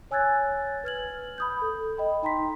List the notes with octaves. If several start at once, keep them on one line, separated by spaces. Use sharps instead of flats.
C#5 G#5 E6 F#6 G#6 A6
B4 F6 G#6 F#7
B5 D#6 G6
A4
D#5 G5 B5
D#4 G5 A#5 C6 B6